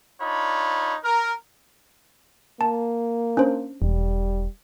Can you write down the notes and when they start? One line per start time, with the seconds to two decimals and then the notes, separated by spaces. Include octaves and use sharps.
0.20 D4 D#4 F4 C#5 B5
1.03 A#4
2.61 A#3 A5
3.37 C#4 D4 C5
3.82 E1 G3